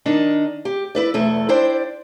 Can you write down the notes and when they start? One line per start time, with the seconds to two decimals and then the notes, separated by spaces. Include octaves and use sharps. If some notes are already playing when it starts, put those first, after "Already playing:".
0.06 D#3 D4 D#4
0.65 G4
0.95 E4 B4 D5
1.14 E2 B2 A3 A4
1.49 D4 E4 C5 D5 G5